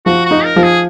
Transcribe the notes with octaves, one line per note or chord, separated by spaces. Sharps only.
F3 F#4
F#4
D#4
A#4
F3
G#4